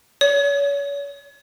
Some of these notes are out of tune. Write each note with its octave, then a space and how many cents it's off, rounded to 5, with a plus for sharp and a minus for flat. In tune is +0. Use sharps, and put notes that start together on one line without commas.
C#5 +35